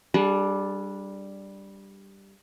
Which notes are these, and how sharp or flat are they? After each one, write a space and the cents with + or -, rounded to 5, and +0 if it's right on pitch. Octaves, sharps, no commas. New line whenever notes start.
G3 +0 D4 +0 G#4 +45